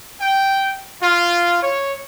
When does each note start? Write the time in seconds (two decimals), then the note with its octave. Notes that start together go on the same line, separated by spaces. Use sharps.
0.21 G5
1.01 F4
1.61 C#5